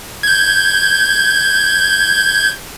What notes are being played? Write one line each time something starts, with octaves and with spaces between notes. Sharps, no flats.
G6 G#6